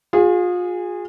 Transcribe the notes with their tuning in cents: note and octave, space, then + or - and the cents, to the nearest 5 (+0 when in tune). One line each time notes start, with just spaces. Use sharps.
F4 +35 G#4 -20